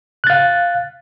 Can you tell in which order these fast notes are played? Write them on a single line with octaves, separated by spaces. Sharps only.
F#6 A6 F5